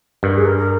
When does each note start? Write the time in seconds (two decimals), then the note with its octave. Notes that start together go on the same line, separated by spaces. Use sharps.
0.23 G2 A#4
0.35 G#4
0.45 A#4
0.57 A#4